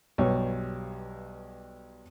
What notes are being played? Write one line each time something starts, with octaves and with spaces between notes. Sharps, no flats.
B1 G2 G3 C#5